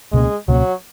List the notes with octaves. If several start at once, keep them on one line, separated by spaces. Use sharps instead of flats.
C#2 B2 G#3 A#3 C#4
C#2 B2 F#3 A#3 C#4